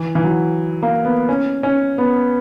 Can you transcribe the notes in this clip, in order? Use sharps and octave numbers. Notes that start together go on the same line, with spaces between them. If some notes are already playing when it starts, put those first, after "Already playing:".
Already playing: E3
E3
F#3
A#3
B3
C#4
C#4
B3